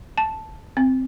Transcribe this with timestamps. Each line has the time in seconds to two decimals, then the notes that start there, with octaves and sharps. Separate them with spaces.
0.18 A5
0.77 C4